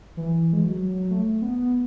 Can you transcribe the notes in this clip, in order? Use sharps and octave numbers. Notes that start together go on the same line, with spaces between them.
E3
G#3
F#3
A3
B3